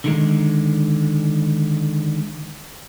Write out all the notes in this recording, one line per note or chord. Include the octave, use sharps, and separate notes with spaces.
D3 D#3 G#3